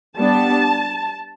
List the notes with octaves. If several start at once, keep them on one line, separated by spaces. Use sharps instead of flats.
G3 B3 D4 A5